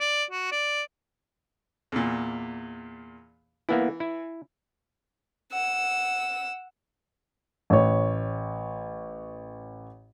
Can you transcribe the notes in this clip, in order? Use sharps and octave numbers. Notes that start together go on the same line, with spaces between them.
D5
F#4
D5
E2 A#2
E3 A#3 B3 E4
E4
F#5 E6
A1 C#5